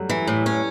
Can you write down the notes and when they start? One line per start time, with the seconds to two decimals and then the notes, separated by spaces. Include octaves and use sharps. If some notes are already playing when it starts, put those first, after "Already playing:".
Already playing: F#3 G3 A3
0.10 E3
0.27 A2
0.46 C#4